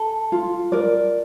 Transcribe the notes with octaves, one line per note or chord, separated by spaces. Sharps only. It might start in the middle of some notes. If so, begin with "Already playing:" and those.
Already playing: A4
F4
A#4 D5